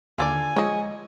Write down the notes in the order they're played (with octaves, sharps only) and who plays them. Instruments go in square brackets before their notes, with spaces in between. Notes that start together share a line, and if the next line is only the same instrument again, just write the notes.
[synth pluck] D#2 D3 [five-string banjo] F4 A4 D5 [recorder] G#5
[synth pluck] F3 G#3 [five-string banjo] C#5 D#5